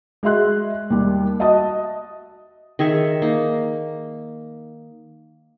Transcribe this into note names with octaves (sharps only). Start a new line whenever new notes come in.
G#3 F#4 G#4 E5 C6 F#6
D#2 G3
F#4 D#5 E5 A5 D#6
D#3 G#4 E5 C#6
A#3 D#4